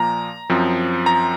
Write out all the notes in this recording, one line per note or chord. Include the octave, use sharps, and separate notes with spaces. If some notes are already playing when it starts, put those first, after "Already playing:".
Already playing: A#2 F3 A#3 A#5
F#2 F3 C4
A#5